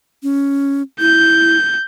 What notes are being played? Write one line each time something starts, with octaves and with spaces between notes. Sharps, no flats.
C#4
E4 G6